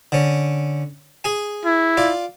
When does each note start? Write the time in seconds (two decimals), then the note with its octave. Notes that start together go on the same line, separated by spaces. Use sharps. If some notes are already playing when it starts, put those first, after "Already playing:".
0.12 D3 C#4
1.24 G#4 G#5
1.65 E4
1.97 F4 D5